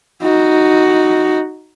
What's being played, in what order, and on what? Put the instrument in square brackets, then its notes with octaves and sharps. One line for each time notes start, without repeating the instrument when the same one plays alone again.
[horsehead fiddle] D#4 F#4